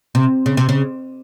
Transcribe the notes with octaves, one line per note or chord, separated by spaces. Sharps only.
C3
C#3
C3
C#3